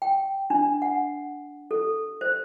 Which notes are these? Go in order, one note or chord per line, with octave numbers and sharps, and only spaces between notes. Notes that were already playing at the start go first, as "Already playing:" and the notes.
G5
D4
F#5
A4
C5